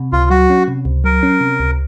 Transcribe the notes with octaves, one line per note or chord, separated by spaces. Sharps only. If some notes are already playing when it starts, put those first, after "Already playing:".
Already playing: C3
C#2 F4
F#3 F#4
C#4
C3
C#2
F#3 A#4
C#4
C3
C#2